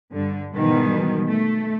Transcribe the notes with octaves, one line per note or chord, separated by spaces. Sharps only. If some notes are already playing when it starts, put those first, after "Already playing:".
G2 D3
G#2 B2 D#3 E3 G3 B3
A3